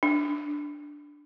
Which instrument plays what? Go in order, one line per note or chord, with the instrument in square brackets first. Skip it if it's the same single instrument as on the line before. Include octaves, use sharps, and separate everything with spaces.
[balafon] D4